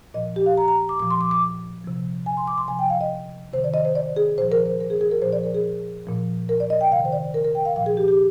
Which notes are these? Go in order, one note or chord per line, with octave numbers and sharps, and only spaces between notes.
A#2 F3 D#5
G4
F5
A#5
A#5
D6
A#2 F3 D6
C6
D6
D6
C3 F3
G#5
C6
D6
C6
C3 F3 G#5
G5
F5
D#5
C3 D#3 C5
D5
D#5
C5
D5
G#4
A#2 F3 C5
A#4
C5
A#4
G#4
G#4
A#4
A#2 F3 C5
D5
A#4
G#4
A#2 F3
A#4
D5
D#5
G5
C3 D#3 F5
C5
D5
A#4
A#4
G5
F5
A#2 F3 F5
G#4
G4
G4